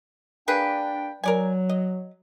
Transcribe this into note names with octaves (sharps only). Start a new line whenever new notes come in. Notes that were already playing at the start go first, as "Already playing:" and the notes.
A#3 D4 G#4 B4 G5
F#3 A#4 D5 G#5
D#5